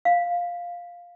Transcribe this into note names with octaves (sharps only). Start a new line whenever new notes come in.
F5